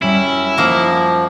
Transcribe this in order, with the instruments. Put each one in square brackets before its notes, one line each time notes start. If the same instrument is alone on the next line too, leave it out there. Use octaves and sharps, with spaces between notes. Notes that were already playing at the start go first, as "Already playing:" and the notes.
[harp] F#2 G3 E6 [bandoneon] C#4 [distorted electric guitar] E4
[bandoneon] F3 [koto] A#3 D#4 [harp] C#4